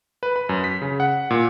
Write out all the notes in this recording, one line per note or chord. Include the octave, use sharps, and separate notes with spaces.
B4
B5
F#2
B6
C#3
F#5
A#2